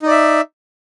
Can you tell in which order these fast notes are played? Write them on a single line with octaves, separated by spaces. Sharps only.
D#4 D5 E5